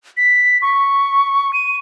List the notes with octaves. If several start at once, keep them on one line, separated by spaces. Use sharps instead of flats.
B6
C#6
D#7